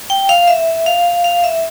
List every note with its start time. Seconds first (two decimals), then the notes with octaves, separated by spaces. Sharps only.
0.10 G5
0.29 F5
0.48 E5
0.86 F5
1.24 F5
1.44 E5